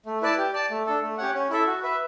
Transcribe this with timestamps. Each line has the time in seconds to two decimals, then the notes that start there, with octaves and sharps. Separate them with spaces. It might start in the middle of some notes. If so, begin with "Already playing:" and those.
0.06 A3
0.22 E4 B4 D5 A5
0.38 G4
0.53 D5 A5
0.70 A3
0.86 D4 A4
1.02 A3
1.18 C#4 G4 C#5 F#5
1.34 C#4
1.50 E4 A4 E5
1.67 F#4
1.83 B4 E5